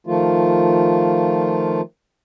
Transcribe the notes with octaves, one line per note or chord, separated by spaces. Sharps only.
D#3 F3 A3 F4